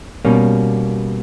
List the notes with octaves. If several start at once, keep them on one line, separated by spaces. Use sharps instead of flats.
B2 G3 A#3 C#4